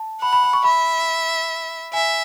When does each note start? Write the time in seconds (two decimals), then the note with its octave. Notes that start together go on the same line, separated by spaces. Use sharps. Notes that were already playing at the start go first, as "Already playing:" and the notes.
Already playing: A5
0.22 F#5 B5
0.33 B5
0.43 B5
0.53 C#6
0.64 E5 B5
1.93 E5 G#5